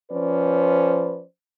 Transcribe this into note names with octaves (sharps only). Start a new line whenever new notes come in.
F3 C#4 B4 C5 D5